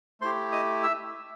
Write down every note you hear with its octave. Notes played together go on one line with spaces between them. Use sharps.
A3 E4 G4 C5 C6
D#5 D#6
E5 E6